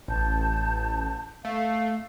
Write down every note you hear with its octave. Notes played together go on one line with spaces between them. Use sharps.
A1 A5 G6
A3 F5